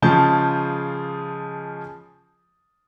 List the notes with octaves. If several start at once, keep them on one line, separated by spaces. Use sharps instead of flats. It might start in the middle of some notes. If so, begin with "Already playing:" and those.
C#3 F3 G#3 G#4 A5 G6